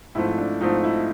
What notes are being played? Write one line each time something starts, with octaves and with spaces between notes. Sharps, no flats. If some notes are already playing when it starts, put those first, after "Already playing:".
G#2 F3 A3 C4 E4
D4
G#2 F3 A3 C4 D#4
E4